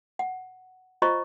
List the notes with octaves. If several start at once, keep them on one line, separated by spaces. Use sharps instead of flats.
F#5
F4 C5 D#5 A#5 C#6